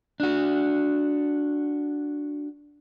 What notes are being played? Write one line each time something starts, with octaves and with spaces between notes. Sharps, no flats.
D4 F#4